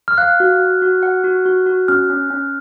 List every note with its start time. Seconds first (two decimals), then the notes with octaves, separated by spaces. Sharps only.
0.08 F6
0.18 F5 F#6
0.40 F#4
0.60 F#4
0.82 F#4
1.03 F#5
1.24 F#4
1.46 F#4
1.66 F#4
1.88 C#4 F6
2.10 C#4
2.30 C#4